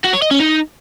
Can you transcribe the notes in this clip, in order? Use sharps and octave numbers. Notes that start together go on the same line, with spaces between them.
F#4
C#5
D#5
C#4
D#4